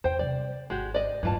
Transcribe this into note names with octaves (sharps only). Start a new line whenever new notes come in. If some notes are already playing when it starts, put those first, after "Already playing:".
E2 C5 G5
C3 G3 D5
G#1 G#3 F#4 G4
D5 D#5
D1 G2 E3 F4 A5